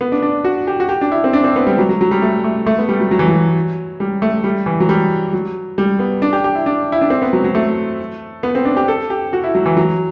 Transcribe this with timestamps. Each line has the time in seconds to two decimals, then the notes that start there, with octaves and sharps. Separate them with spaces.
0.01 B3
0.12 D4
0.22 D4
0.44 F#4
0.67 G4
0.80 F#4
0.89 G4
1.01 D4
1.12 E4
1.24 C4
1.33 D4
1.44 C4
1.56 B3
1.67 G3
1.78 F#3
1.89 F#3
2.01 F#3
2.11 G3
2.22 A3
2.44 A3
2.67 A3
2.78 B3
2.89 G3
3.00 F#3
3.11 F#3
3.19 E3
3.28 F#3
4.00 G3
4.22 A3
4.44 G3
4.66 E3
4.80 F#3
4.89 G3
5.33 F#3
5.78 G3
5.99 B3
6.22 D4
6.33 G4
6.44 G4
6.55 E4
6.66 D4
6.92 E4
7.01 D4
7.10 C4
7.22 B3
7.33 F#3
7.44 F#3
7.55 A3
8.43 B3
8.55 C4
8.65 D4
8.77 G4
8.88 A4
9.10 G4
9.33 F#4
9.44 E4
9.55 F#3
9.66 E3
9.77 F#3